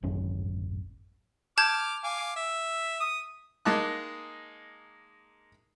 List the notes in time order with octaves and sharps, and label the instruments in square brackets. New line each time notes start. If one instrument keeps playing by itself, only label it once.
[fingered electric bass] D1 G#1 F#2 C#4
[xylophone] A5 G6 G#6 [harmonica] D6 F6
[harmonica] F5 G#5 D6
E5
D#6
[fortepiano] G#3 A#3 D#4 A5 D6 F#6